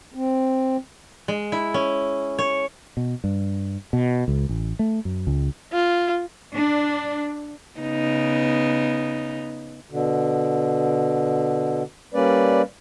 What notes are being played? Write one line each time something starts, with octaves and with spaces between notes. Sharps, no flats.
C4
G#3
E4
C#4
C#5
B2
G2
B2
C#2
A1
A3
F#2
C#2
F4
D4
C#3 B3 D#4
B2 D3
G3 A#3 C#4 B4 D5